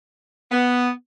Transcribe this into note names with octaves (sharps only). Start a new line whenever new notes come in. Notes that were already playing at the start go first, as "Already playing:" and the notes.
B3